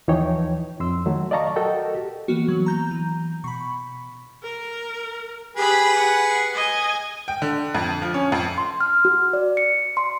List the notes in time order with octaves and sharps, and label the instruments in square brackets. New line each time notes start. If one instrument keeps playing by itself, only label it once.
[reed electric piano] D#2 E3 F3 D#4 C#5 G5
F2 C6 E6
D#3 F#3 A3
D5 D#5 F5 A5 A#5 C#6
F#4 A4 A#4 D#5 G5
G4
[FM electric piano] E3 A#3 B3 [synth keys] F#4
[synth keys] F#3
A#5 G6
[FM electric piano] E3
[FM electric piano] B2 [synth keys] B5 C#6
[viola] A#4
[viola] G4 B5 [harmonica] G#4 B4
[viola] F#5
D#5 G#5
[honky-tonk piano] G5
D3
F2
F3
C#4
F2
[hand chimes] C6
F6
F#4
D5
C#7
C6